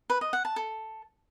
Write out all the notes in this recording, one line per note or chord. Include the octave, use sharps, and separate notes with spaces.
B4
D#5
F#5
A5
A4